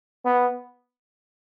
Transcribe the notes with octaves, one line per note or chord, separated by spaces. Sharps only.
B3